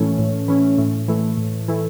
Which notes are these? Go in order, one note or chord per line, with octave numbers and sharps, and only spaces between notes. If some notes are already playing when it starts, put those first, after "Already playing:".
Already playing: A2 E3 A3 C#4
A2
E3 A3 C#4
A2
E3 A3
A2
E3 A3